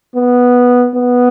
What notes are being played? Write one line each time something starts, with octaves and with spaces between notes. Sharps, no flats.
B3
B3